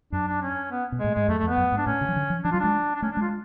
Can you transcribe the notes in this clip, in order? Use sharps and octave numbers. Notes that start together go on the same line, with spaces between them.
F#2 D4
D4
C#4
B3
B2
A2 G#3
G#2 G#3
F#2 A3
A3
F2
B3
F#2
G#2
D4
A2 C#4
C#3
F3
D3
F3
F3 D4
F#3 F4
G#3 D4
D4
A3 C#4
D4
G#3 F4